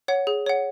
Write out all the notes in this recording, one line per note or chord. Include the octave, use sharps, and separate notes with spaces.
C#5 F#5
G#4
C#5 F#5